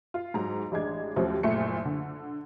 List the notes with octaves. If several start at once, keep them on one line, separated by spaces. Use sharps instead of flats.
F4
G#2 F#3 A#5
A1 G#3 D4 G#6
D#2 F3 F#3 A3 C4 C#4
F#1 A#2 A3 C#7
D3